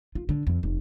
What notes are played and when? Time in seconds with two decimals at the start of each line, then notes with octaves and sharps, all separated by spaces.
0.15 F4
0.29 D3
0.47 F2
0.63 F1